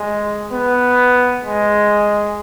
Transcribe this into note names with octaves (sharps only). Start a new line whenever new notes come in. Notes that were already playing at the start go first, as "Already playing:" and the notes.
Already playing: G#3
B3
G#3